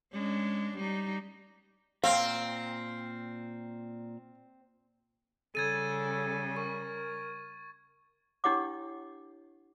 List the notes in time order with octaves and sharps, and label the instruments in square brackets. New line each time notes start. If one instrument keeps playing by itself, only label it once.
[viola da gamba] G#3 C#4 D4
G3 D#4
[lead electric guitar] A#2 A#4 [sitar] C4 [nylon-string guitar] F5
[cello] C#3 G3 [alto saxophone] A4 [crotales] G#6 A6 D#7
[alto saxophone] A#4 [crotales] C#6
[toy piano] D4 E4 G4 C#5 F#5 D6